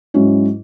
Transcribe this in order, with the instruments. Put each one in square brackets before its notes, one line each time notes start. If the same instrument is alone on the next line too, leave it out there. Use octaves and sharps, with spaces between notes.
[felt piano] G#2 F#3 C#4 E4